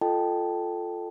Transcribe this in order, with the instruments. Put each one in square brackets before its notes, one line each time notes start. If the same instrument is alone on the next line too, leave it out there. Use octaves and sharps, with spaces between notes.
[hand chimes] F4 A4 D#5 G5 A5